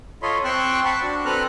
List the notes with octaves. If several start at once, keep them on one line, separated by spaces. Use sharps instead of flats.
F4 A4 C#5 D#5 B5 C6
C4 G5 C6 C#6 E6 F#6
F#5 A5 B5 C#6
D4 F#4
C4 A4 B4 A#5 F6 F#6